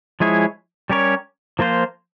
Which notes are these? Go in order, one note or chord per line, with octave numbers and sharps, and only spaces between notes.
F3 G#3 E4 G#4 C#5
G3 C#4 G4 A#4 C#5
F3 A#3 F4 C5